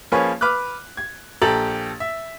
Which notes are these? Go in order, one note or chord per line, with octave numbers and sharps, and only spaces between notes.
F3 A#3 C#4 G#4 B4 C#5
B4 D6 F6 F#6
G#6
A#1 G4 A4 A#5 A6 F#7
E5